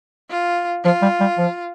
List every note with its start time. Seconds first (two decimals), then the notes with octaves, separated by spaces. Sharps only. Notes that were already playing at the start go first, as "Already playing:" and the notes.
0.30 F4
0.84 F3 F4
1.02 G3
1.20 G3
1.38 F3